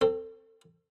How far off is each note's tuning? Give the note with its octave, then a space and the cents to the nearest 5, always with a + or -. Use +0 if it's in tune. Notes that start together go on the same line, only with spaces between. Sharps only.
C4 +0 A4 +30